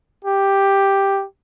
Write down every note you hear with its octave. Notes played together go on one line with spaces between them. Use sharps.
G4